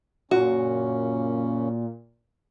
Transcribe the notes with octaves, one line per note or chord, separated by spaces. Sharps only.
F#2 A#2 C#3 C#4 F#4